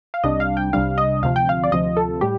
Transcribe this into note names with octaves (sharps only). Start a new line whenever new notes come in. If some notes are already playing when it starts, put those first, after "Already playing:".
F5
C2 C3 G3 D4 D#5
F5
G5
C2 C3 G3 D4 F5
D#5
D2 C3 F3 F5
G5
F5
D5
D2 C3 F3 D#5
A4
A2 G3 G4